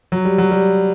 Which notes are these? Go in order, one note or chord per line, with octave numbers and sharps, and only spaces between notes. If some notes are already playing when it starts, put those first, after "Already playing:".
F#3
G3
F#3
G3